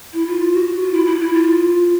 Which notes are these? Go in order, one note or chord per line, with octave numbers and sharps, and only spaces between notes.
E4
F4
F#4
F4
E4
E4
E4
F4